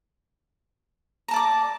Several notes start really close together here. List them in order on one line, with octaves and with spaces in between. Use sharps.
A#5 A5 D5 D6